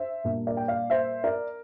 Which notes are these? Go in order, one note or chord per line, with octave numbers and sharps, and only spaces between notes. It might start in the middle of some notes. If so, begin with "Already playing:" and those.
Already playing: C5 E5
A#2 G3 A#3 D4
A#4 D5
G5
D5 F5
C5 E5
A#4 D5